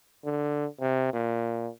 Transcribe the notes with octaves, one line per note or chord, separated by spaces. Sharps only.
D3
C3
A#2